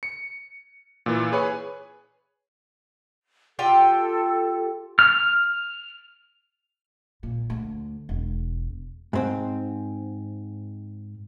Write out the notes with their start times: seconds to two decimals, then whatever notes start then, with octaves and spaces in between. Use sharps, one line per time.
0.03 C#7
1.06 A#2 E3
1.32 G#4 B4 C#5 G#5
3.59 F4 G4 A4 G5
4.99 F6
7.23 A#2
7.50 D2
8.09 E1
9.13 G#2 C4